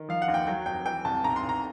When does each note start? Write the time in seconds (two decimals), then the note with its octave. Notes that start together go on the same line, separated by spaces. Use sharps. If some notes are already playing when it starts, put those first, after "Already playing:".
Already playing: D#3
0.09 F3 F5
0.22 F#5
0.28 D#2
0.34 G5
0.47 F#3 G5
0.66 F1 G5
0.85 E3 G5
1.05 C2 A5
1.24 B1 A#5
1.36 C6
1.43 B1
1.49 A#5